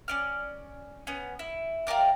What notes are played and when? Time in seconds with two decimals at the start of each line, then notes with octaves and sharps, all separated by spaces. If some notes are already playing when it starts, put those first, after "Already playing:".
0.08 C#4 D5 F6
1.07 B3 C#4
1.39 E4
1.87 F4 G4 A#4 D5